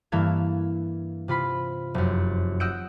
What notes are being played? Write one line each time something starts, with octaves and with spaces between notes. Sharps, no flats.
G2 E3 A#3 A4 F5 G#6
C3 F4 B5 C7
F1 F#2
D#5 F#5 E6 G6 D7